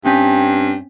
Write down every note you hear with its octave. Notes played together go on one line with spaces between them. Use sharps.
G2 C4 C#4 B6